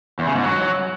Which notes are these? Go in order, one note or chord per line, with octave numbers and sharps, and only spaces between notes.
E2
C#3
G#2
F#3